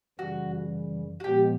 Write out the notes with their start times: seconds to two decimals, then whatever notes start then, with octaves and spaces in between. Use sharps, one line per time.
0.19 F#2 C#3 E3 G3 F#4
1.20 F#4
1.24 A#2 F3 G#3 B3 G4